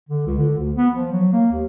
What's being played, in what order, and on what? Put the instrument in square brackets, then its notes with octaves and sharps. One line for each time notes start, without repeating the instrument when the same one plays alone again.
[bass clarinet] D3
C#2
D3
D2
B3
F3
F#3
A#3
D#2